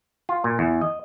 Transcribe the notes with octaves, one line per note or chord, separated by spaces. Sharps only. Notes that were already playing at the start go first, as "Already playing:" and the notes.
F4
A#2
E2
D#5